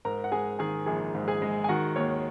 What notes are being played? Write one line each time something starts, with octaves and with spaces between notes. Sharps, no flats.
G#2 A#4 A#5
F#5
G#3 G#4 G#5
D#3 G#4 G#5
A#1 G#4 G#5
G#2
G#4 G#5
G#3
G#5
D#3 F#4 F#5
D#2 C#5